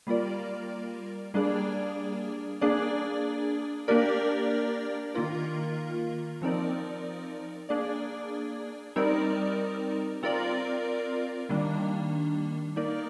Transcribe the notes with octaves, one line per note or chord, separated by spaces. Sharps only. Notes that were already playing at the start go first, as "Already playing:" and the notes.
G3 A#3 F4 A#4 D5
G3 A#3 D4 G#4 D5
A#3 D4 G#4 D5
A#3 D4 G4 A#4 D5
D#3 A#3 F4 A#4
F3 C4 D#4 A#4 D5
A#3 D4 G#4 D5
G3 C4 D#4 A#4 D5
C4 F4 A#4 D5
D#3 G3 A#3 D4
A#3 D#4 A#4 D5